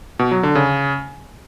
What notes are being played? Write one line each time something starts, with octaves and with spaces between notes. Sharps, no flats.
B2
F#3
D3
C#3